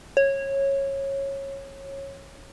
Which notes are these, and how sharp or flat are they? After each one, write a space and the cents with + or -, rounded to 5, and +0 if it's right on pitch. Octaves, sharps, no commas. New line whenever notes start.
C#5 -15